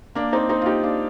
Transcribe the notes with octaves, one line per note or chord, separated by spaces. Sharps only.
A#3 D4
C4 D#4
C4 D#4
F4
D#4 G4
D4 F4